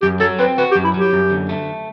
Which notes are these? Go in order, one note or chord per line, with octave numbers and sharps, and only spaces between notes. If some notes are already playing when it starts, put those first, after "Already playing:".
F#2 G4
F#3 A4
C4 B4
F#4 B4
G4
F#2
E4
F#3
G4
F#2
D3
A3